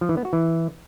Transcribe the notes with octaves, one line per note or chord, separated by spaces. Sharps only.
F3
E3
B3
F#4
E3